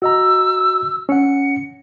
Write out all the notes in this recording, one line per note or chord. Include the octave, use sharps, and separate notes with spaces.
F#4 D#5 A#5 E6
C#4 F#5 C#7